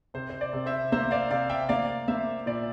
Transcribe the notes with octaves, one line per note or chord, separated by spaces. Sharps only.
C3 C5
C5
D5
C3
C5 E5
A#3 C5 E5
D5 F5
C3 D5 F5
E5 G5
A#3 D5 F5
A#3 C5 E5
A#2 D5